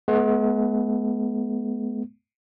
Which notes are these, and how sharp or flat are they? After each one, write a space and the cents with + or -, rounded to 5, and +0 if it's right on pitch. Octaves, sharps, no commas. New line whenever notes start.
G#3 +45 B3 -5